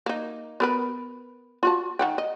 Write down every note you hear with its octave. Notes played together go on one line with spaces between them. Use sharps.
A#3 D#4
B3 A#4 B4
F4 F#4 A5
D#3 F#5 G5
D#5